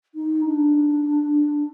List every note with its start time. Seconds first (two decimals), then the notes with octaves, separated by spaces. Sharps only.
0.15 D#4
0.46 D4